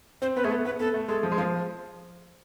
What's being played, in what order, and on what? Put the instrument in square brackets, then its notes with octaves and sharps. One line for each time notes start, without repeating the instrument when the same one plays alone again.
[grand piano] C4 [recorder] C5
[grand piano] B3 [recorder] B4
[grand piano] A3 [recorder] G#4
[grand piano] B3 [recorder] A4
[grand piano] B3 [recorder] B4
[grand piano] B3 [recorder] A4
[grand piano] A3
[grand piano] G#3 [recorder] A4
[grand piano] F3
G#3
[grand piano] F3 [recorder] F5